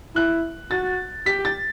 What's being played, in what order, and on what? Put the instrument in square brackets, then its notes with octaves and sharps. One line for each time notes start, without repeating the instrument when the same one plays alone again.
[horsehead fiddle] E4 [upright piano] F#6
[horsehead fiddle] F#4 [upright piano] A6
[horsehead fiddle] G4 [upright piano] B6
[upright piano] A6